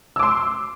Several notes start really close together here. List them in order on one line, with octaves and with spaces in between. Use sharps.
E6 D6 C6